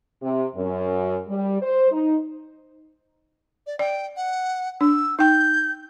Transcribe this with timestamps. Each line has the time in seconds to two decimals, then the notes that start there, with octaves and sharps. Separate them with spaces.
0.22 C3
0.56 F#2
1.27 G3
1.61 C5
1.91 D#4
3.67 D5
3.79 D5 G5
4.17 F#5
4.81 D4 E6
5.19 D#4 G5 G6